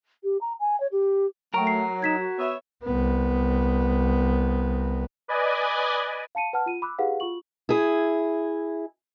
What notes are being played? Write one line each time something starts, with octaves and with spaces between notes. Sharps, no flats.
G4
A#5
G#5
C#5
G4
F#3 A3 A#4 G5 C#6 D7
C7
D#4 G#6 B6 E7
F#4
B3 C#5 E5
C2 B3
B4 D5 D#5 G#5
F5 A5 C#7 D#7
B4 F#5 A5 F6
F4 D#7
B5 D6 E6 F#6
E4 G4 G#4 B4 F5 F#5
F4 F#4 C#6 F#7
E4 G#4